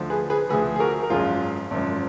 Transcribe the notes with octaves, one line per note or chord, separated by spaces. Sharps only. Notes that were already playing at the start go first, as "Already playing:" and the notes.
Already playing: D2 D3 F3
G#4 B4
G#4 B4
D2 D3 F3 G#4 B4
G#4
F#4 A#4
A#4
G#1 F#2 F3 F4 G#4
G#1 F#2 F3